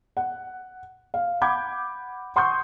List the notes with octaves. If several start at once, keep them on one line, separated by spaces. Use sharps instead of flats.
F#5
F5
F#5 B5 D6 G6 G#6
F#5 C6 C#6 D#6 G6